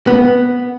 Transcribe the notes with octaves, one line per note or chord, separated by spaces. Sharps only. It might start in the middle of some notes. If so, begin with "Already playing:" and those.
B3